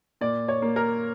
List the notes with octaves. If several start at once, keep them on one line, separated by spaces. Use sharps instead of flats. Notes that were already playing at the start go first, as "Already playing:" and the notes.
A#2 D5
C#5
A#3
A#4